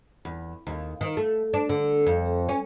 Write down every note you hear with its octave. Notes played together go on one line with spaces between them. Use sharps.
E2
D#2
D#3
A3
D4
D3
F2
C#4